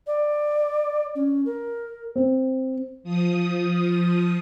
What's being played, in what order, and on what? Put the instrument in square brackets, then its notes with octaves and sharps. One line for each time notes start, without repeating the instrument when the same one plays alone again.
[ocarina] D5
C#4
A#4
[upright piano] C4
[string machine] F3 D#6